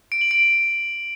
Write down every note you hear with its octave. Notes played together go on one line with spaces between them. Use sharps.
D7
F#7
D7